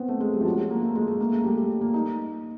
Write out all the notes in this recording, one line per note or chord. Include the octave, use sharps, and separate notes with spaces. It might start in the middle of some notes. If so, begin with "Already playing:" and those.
Already playing: B3 C4
A3
G#3
G3
F3
F#3
A#3
A3
G#3
A3
A#3
A3
G3
G3
A#3
D#4